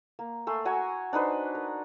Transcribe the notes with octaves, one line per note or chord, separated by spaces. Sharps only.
A#3
A3 G#5 C6
F#4 G#5 A#5 E6
D4 D#4 B4 C5
A#4